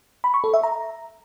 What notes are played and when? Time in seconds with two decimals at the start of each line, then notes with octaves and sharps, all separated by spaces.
0.24 B5
0.34 C#6
0.44 A4
0.54 E5
0.63 A#5